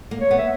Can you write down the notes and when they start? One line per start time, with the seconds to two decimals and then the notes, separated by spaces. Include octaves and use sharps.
0.11 A#3
0.21 C#5
0.31 B3
0.38 E5